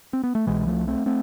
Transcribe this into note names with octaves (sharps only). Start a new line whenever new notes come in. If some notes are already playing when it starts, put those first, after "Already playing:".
C4
B3
A3
C2 B2 E3 G#3
F3 A3
A3 C4
A3 C4